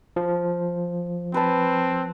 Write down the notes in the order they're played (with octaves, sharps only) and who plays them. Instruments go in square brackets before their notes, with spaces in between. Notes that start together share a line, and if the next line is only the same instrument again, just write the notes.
[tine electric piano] F3
[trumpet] C4 [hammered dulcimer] B4 A5